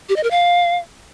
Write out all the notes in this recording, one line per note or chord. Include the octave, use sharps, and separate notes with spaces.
G4
D#5
A#4
F5